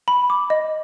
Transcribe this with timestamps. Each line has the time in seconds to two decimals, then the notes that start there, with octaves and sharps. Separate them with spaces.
0.08 B5
0.30 D6
0.50 D#5